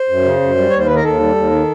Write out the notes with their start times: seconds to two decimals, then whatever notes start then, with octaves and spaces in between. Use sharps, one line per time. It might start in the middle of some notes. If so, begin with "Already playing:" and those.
Already playing: C5
0.09 F#2
0.25 C#3
0.41 F#2
0.56 G3
0.70 D#2 C#5
0.79 C5
0.86 D#3 B4
0.95 A#4
1.04 D#2 A4
1.19 G3
1.35 D#2
1.51 D#3